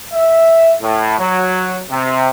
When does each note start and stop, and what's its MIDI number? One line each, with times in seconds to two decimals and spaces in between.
0.13 0.73 76
0.81 1.18 45
1.19 1.81 54
1.91 2.29 48